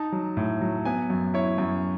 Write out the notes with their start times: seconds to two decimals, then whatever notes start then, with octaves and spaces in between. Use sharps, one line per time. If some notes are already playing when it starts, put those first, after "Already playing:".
Already playing: D#4 A5
0.12 F#3
0.37 A2
0.61 F#3
0.85 B3 G#5
1.10 F#2
1.34 E4 C#5
1.58 F#2